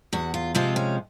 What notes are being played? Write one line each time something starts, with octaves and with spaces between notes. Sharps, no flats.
E2 F#4
F4
C3 F3 G#3 C4 F4
C#4